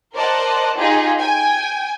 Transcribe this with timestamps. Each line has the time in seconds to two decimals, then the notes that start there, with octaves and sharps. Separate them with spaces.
0.14 A#4 C5 D5 D#5 F#5 A5
0.77 D#4 F4 G4 G#4 D#5
1.19 G5 G#5